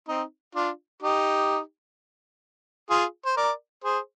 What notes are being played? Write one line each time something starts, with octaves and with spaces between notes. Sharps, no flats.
C4 D#4
D4 F4
D#4 G4
F4 G#4
C5
A#4 D5
G#4 C5